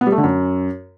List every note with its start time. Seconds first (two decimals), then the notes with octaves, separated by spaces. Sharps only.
0.01 B3
0.07 G3
0.12 A3
0.18 D3
0.23 F#2